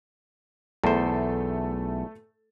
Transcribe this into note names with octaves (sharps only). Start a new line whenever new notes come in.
B1 E2 A3 A4 C5